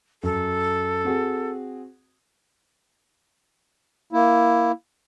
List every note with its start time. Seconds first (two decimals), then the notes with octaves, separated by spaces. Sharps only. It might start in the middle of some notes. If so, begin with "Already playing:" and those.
0.23 F#2 A4
1.04 C4 F#4 G#4
4.13 A#3 E4